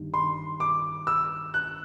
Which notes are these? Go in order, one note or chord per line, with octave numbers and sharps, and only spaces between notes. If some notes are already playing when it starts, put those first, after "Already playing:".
Already playing: G1 G2 D#3
C6
D6
E6
F#6